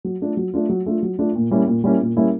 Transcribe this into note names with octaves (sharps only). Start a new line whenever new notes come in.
F#3
A3 D4 F4
F#3
A3 D4 F4
F#3
A3 D4 F4
F#3
A3 D4 F4
A#2
G3 A#3 C#4 E4
A#2
G3 A#3 C#4 E4
A#2
G3 A#3 C#4 E4